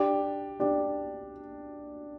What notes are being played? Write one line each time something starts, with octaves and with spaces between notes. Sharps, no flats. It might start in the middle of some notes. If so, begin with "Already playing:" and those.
Already playing: D4 G4
D4 G4